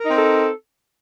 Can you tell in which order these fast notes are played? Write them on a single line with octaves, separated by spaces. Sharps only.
A#4 D#4 C4 A4